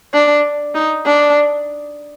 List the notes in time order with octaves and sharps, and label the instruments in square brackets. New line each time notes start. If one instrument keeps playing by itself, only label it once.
[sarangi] D4
D#4
D4